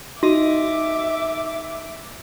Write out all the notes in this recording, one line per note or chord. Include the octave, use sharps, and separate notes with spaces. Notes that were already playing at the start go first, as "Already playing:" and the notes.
D#4 F#4 D#5 E5 D6